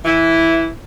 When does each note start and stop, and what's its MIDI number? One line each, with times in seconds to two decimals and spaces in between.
0.05 0.67 52
0.05 0.67 64